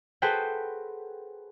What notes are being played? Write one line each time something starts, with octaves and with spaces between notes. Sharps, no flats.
F#4 G#4 A4 B4 C5 G5